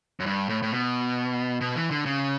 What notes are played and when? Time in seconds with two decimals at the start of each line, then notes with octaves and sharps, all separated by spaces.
0.20 F#2
0.26 G2
0.49 A2
0.62 A2
0.72 B2
1.61 B2
1.76 E3
1.91 D3
2.06 C#3